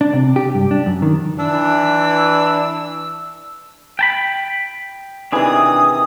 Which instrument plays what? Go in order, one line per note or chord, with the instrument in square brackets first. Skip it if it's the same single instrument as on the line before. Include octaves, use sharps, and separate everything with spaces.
[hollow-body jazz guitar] D4
C3
G4
G2
D4
F#2
D#3
[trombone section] E3 [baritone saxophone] D4 [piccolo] E6
[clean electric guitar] G5 A5 B5
[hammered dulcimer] C3 D#3 E3 [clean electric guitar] D4 G#4 [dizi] D#6